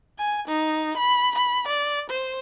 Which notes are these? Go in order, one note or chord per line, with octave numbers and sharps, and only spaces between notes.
G#5
D#4
B5
B5
D5
C5